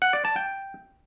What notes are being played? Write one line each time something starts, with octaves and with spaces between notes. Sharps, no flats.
F#5
D5
A5
G5